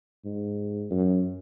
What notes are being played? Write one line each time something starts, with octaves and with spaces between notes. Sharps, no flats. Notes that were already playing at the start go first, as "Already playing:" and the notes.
G#2
F#2